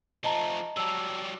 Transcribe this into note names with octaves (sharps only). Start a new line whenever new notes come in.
F3 A3 D#5 A5 A#5
F#3 G3 A5 E6